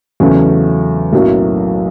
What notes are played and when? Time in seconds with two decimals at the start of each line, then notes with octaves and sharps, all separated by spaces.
0.20 E2 C#3 F#3 A3 C#4
1.13 B1 A2 F#3 A#3 C#4